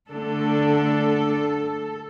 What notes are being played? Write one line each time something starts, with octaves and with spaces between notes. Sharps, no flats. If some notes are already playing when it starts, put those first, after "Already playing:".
D3 A3 D4 A4